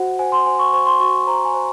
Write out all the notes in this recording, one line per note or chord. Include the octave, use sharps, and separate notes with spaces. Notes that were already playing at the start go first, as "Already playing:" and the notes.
Already playing: F#4 C5 F#5
C5 G#5
C6
C5 G#5
C#6
C5 C#6
C6
F#4 C#6
C5 A#5
G#5
C5